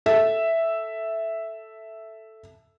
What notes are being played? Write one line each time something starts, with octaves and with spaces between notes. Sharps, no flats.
A4 E5